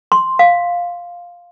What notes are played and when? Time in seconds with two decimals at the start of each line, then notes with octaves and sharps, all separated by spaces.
0.12 C6
0.39 F5